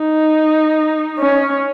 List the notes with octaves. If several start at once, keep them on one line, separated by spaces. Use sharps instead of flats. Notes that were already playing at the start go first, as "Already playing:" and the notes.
Already playing: D#4
C#4